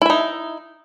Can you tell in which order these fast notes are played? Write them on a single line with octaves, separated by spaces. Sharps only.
E4 E5 D#4